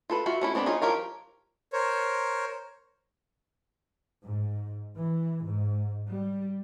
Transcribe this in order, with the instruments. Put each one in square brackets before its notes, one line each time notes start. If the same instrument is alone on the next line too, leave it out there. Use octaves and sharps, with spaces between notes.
[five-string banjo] F4 A4 B4
F4 F#4 E5
A3 C#4 E4
B3 C4 D4 A4
C#4 D#4 F4 G#4
F3 G4 A#4 C#5 F5
[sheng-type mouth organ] A#4 C5 C#5
[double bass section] G#2
E3
G#2
G3